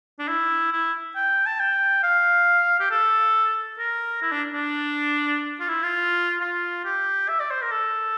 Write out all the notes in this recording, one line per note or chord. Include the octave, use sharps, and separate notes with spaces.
D4
E4
E4
G5
A5
G5
F5
G4
A4
A#4
E4
D4
D4
F4
E4
F4
F4
G4
E5
D5
C5
A#4
A4